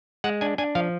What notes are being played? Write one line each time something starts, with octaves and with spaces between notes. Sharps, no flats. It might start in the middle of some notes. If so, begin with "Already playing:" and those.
G#3 F#5
D4 G#5
D4 G#5
F3 F5